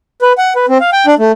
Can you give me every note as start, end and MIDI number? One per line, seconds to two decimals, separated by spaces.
0.22 0.33 71
0.38 0.53 78
0.56 0.66 71
0.69 0.78 60
0.80 0.90 77
0.93 1.06 79
1.07 1.15 62
1.19 1.32 57